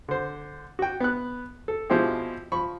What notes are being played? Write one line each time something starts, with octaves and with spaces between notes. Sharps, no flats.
D3 C5
F#4 G5
B3 F#6
A4
B2 F3 G#3 C4 E4 G4
F3 B5 C#6